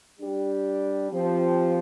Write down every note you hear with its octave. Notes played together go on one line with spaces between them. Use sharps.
G3 D4 G4
F3 C4 G4